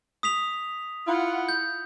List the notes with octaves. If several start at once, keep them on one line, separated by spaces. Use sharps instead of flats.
D#6 B6 F7
E4 F4 F#5
G6